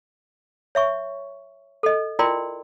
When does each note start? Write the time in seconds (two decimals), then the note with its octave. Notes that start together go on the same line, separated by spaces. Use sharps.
0.75 C#5 E5 C#6
1.83 A4 D#5
2.19 E4 F4 A#4 D5 G5 C6